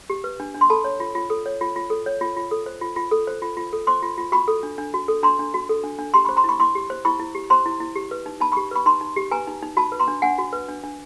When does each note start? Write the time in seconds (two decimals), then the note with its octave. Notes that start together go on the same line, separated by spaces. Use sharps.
0.10 G4
0.24 B4
0.40 D4
0.55 D4
0.61 C6
0.70 A4 A5 B5
0.84 C#5
1.00 F4
1.15 F4
1.30 A4
1.46 C#5
1.61 F4
1.76 F4
1.90 A4
2.06 C#5
2.21 F4
2.37 F4
2.51 A4
2.66 C5
2.81 F4
2.96 F4
3.11 A4
3.27 C5
3.42 F4
3.57 F4
3.73 A4
3.87 C5 C6 D6
4.02 F4
4.18 F4
4.32 F#4 B5 C#6
4.48 A4
4.63 D4
4.78 D4
4.94 F#4
5.08 A4
5.23 D4 A#5 C6
5.39 D4
5.54 F#4
5.69 A4
5.84 D4
5.98 D4
6.14 G4 A#5 C6
6.25 C5 B5 C#6
6.37 A#5 C6
6.44 E4 B5 C#6
6.59 E4 C6 D6
6.75 G4
6.90 C5
7.05 E4 B5 C#6
7.20 E4
7.35 G4
7.50 C5 A#5 C6
7.66 E4
7.80 E4
7.96 G4
8.11 B4
8.26 D#4
8.41 D#4 A5 B5
8.52 G4 B5 C#6
8.71 B4 B5 C#6
8.86 D#4 A#5 C6
9.01 D#4
9.16 G4
9.31 B4 G#5 A#5
9.48 D#4
9.62 D#4
9.77 F#4 A5 B5
9.92 B4
10.00 A#5 C6
10.08 D4
10.22 D4 F#5 G#5
10.38 F#4
10.53 B4
10.69 D4
10.84 D4